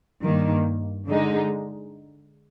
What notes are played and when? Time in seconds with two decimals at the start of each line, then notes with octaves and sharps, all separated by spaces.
0.23 G2 D#3 A#3
1.07 D3 G#3 D#4